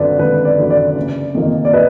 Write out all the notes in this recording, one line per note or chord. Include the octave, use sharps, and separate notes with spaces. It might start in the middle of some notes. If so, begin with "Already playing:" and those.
Already playing: G#1 F#2 D3 B4 D5
G#1 B4
D5
F#2 D3
D5
F#1
F2 D#3 A#3
D5
B4 D#5